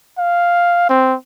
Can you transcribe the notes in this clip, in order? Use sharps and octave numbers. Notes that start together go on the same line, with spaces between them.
F5
C4